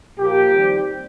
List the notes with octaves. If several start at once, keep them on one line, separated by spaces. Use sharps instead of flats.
A#2 F3 A#3 G4
D#3 G3 C4